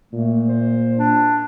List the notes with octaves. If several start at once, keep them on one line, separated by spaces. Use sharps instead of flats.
A#2 A3
C5
D4